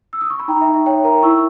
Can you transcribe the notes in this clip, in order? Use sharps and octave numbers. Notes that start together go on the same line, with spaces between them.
E6
D#6
C#6
B5
D#4 G5 A#5
E5
D#4
E5
C#5 G5
A#4 G5 A#5
E4 C#6 E6